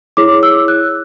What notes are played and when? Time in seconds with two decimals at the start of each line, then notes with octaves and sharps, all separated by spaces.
0.17 E4 G#4 C#5 D6
0.43 E6
0.68 F#6